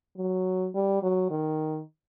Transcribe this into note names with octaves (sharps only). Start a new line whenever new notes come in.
F#3
G3
F#3
D#3